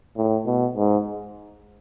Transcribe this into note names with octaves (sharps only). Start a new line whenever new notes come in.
A2
B2
G#2